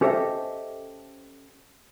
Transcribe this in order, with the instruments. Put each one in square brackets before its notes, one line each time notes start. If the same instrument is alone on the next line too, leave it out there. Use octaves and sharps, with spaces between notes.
[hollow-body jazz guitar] C#4 G4 A4 C5 D#5 E5